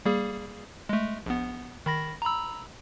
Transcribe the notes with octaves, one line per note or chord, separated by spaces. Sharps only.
G3 A#3 G#4
G#3 A3
A#1 B3
D#3 B5 A#6
A#5 B5 E6